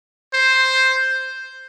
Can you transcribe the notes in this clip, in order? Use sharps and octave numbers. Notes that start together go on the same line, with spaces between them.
C5